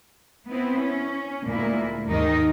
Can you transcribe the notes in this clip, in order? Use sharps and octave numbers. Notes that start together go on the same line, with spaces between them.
B3 C4 E4
C#4
D2 A#2 G#3 A#3 E4
D#2 G#2 D#3 D#4 A#4 D#5